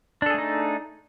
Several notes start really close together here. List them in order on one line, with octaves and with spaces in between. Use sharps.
D4 A4 G#4 A3 D#4